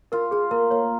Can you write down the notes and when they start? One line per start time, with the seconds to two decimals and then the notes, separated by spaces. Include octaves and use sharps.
0.12 F4 A#4
0.31 F4 G#4
0.51 A#3 A#4
0.71 A#3 C#5